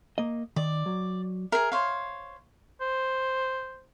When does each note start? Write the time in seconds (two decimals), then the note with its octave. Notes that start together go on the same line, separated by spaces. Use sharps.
0.18 A#3 D#5
0.56 D#3 D5
0.86 F#3
1.52 G#4 A#4 E5
1.72 C5 C#5 F5
2.81 C5